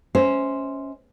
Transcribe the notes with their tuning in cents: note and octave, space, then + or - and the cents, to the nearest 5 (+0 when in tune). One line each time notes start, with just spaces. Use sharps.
C#4 +0 C5 +0 E5 -35